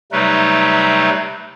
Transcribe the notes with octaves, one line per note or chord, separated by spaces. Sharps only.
C3 F#3 G3 A3 D#4 B4